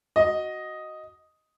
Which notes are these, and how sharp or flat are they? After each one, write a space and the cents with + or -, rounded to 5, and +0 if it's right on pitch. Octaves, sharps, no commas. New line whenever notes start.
F#4 +0 D#5 +0